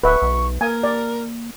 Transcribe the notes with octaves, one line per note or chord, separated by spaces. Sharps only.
D1 B4 E5 C#6
B1
A#3 A#4 G#5
D5